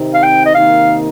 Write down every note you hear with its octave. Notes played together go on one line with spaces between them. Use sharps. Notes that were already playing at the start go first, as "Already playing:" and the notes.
Already playing: C3 D#3 C4 D#4
F5
G5
D#5
C3 D#3 A#3 D#4 F5